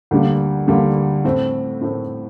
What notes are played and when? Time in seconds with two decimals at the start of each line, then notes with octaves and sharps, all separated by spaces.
0.11 D2 D3 G3 A#3
0.68 D2 D3 G3 A#3
1.25 A2 A3 C4
1.81 A2 A3 C4